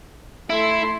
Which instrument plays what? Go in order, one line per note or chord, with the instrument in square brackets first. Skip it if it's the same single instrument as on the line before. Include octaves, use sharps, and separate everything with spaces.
[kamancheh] A3 C6 [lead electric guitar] E4